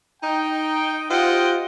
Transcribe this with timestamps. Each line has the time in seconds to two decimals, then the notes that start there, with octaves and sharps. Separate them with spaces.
0.23 D#4 G5
1.10 F4 G4 C5 D#5 F#5 G5